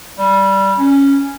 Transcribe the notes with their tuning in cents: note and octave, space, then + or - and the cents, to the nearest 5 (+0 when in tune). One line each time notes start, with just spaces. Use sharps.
G3 -10
C#4 +0